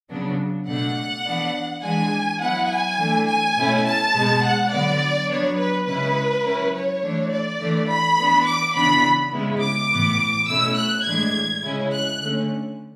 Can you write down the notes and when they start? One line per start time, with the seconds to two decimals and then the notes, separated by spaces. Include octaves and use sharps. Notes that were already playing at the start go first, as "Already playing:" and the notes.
0.11 C#3 F#3 B3 D4
0.68 B2 A3 D4 F#5
1.26 E3 B3 D4
1.83 E3 G#3 D4 G#5
2.41 F#3 B3 E4 F#5
2.70 G#5
2.98 E3 A3 D4
3.28 G#5
3.56 B2 A3 C#4 E4
3.85 A5
4.14 B2 G#3 B3
4.43 F#5
4.71 D3 F#3 B3 D5
5.29 F#3 B3 D4 C#5
5.58 B4
5.87 C#3 G#3 C#4 E4 B4
6.44 F#3 C#4 E4
6.74 C#5
7.02 E3 A3 D4
7.31 D5
7.60 E3 A3 D4
7.89 B5
8.17 E3 B3 D4
8.47 D6
8.75 C#3 E3 B3 D4 B5
9.33 C#3 G#3 B3 E4
9.62 D6
9.91 A2 E3 B3
10.48 B2 A3 C#4 E4 E6
10.77 F#6
11.06 A2 E3 G#3 D4 G#6
11.63 C#3 G#3 C#4 E4
11.93 F#6
12.21 D3 A3 C#4